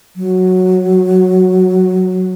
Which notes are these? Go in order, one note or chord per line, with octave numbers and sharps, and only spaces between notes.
F#3